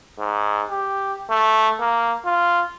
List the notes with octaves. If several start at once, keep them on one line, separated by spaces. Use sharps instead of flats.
G#2
G4
A3
A#3
F4